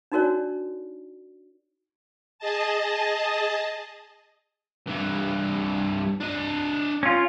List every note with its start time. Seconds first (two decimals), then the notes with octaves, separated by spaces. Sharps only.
0.12 D4 D#4 F#4 A#4 C#5 D5
2.39 G#4 D#5 A5
4.88 G2 E3
6.20 D4 D#5
7.03 C#4 F4